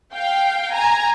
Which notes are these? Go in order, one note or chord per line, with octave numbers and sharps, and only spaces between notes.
F5 G5
G#5 A#5